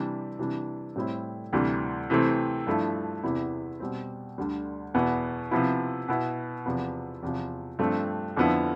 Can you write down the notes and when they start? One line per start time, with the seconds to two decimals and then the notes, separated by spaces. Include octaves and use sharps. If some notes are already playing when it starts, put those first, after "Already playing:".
Already playing: C3 E3 G3 D4
0.39 C3 E3 G3 D4
0.96 A2 G3 C4 E4
1.53 D2 C3 E3 G3
2.10 C3 E3 A3 C4
2.67 G2 F3 A3 E4
3.23 E2 C3 E3 B3 E4
3.80 B2 G3 C4
4.38 D2 D3 G3
4.94 E2 B2 B3 E4
5.51 C3 F3 B3 E4
6.08 B2 B3 E4
6.66 E2 C3 F3 B3
7.23 E2 C3 F3
7.79 G2 F3 A3 C4
8.36 F2 D3 F3 B3 E4